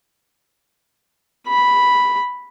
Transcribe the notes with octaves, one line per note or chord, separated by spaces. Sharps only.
B5